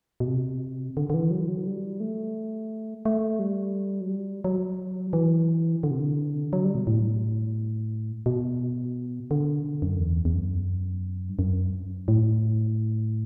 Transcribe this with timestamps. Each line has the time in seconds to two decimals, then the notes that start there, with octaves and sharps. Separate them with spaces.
0.20 B2
0.28 C3
0.97 D3
1.10 D3
1.14 E3
1.31 F#3
1.41 E3
1.48 F#3
1.66 G3
2.00 A3
3.05 A3
3.39 G3
4.01 F#3
4.09 G3
4.44 F#3
5.13 E3
5.83 D3
5.91 C3
6.00 D3
6.53 F#3
6.64 G3
6.75 B2
6.87 A2
8.26 B2
9.31 D3
9.82 F#2
10.00 E2
10.25 E2
10.34 F#2
11.29 G2
11.39 F#2
12.08 A2